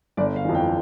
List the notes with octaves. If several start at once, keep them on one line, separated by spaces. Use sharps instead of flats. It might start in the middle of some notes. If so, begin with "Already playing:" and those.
G1 D5
F5
F2 E3
G5